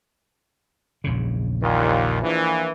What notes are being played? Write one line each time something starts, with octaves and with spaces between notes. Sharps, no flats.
A#1 E2 C#3
D#2 A#2
A#1 E3